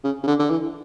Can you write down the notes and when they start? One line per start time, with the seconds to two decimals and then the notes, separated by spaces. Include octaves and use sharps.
0.04 C#3
0.23 C#3
0.27 D3
0.39 D3
0.50 E3